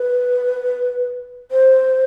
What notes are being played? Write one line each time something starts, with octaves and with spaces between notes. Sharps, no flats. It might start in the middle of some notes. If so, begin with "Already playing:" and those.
Already playing: B4
C5